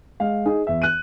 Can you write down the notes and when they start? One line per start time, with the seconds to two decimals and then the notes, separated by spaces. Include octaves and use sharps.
0.20 G#3 F5
0.46 D#4 G#4
0.67 E2 E5
0.82 F#6 D#7